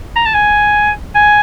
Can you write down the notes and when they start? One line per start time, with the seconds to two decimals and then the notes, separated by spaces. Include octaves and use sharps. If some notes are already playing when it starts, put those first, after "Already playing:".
0.16 A#5
0.26 A5
0.34 G#5
1.15 G#5